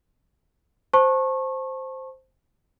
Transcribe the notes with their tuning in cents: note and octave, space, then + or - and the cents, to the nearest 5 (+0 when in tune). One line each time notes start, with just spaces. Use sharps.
C5 +0 A5 +0 C#6 -25